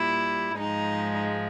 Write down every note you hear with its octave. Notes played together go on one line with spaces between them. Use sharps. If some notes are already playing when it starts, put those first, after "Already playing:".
Already playing: A#2 G3 E4
G#2 F3 G#3 D#4